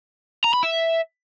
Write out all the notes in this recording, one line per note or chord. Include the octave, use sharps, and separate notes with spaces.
A#5
B5
E5